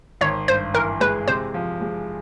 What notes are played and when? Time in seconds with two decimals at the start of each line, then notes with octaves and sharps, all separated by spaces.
0.21 G#1 C#5
0.48 G2 C5
0.74 E3 A#4
1.00 G#3 B4
1.28 C3 C5
1.54 F3
1.81 G#3